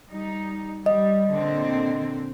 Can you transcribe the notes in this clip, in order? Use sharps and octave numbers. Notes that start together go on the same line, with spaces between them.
G3 D#4
G3 D#5
A#2 D3 C4